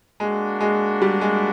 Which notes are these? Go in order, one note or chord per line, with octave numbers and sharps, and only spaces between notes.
G#3 A#3 D4 F#4
G#3
G3
G#3